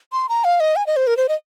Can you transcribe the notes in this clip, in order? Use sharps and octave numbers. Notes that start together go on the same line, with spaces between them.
C6
A#5
F5
D#5
G#5
D#5
C5
A#4
C5
D#5